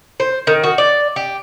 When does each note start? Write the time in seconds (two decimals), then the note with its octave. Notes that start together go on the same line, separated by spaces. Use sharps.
0.20 C5
0.47 D#3
0.64 F#4
0.78 D5
1.16 G4